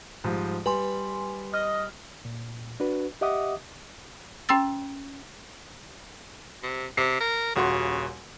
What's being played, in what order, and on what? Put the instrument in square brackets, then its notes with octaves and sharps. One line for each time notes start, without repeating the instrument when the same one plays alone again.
[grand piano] G#2 F3 G3
[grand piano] G3 [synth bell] B4 G#5 C6
[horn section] D#5 [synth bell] F6
[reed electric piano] A#2
D4 F#4 B4
G4 D#5 E5 F#5 D6 D#6
[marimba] C#4 G5 C6 E6 A6
[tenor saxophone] C3
[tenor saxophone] C3 [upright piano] C7
[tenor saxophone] A#4
[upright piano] D#1 F#4 C6 [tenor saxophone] C#3